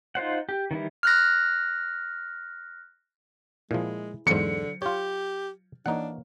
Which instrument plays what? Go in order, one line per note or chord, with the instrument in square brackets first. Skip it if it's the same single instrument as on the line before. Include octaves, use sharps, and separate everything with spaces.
[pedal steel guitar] D#4 F4 C5 F#5
G4
D#3 E3 G3 E4
[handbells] F6 F#6 A#6
[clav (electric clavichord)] A#2 F3 [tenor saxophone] G#3 [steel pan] E4 G#4
[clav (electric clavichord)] E2 G#2 [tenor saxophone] D3 [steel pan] F#3 C5 [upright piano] C#7
[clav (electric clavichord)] F4 C#5 [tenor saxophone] G4
[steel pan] E3 A#3 C#5 [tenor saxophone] D4 [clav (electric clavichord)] D#4 F#5